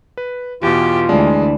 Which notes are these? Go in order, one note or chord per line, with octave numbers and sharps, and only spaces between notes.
B4
E2 B2 F4 G4
D2 E3 G#3 D4